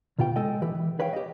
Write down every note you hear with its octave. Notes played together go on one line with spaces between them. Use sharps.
D2 B2 F4 G4 G5
G#3 A4 D#5 G5
E3 G4 B4
E3
G#4 B4 C#5 F5 G5
G4 D#5